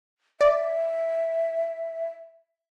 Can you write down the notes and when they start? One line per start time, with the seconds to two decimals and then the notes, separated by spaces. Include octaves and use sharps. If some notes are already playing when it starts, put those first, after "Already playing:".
0.41 D5 E5